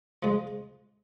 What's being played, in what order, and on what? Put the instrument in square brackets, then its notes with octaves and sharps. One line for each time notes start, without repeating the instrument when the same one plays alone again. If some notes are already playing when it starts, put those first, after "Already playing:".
[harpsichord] F3 G#3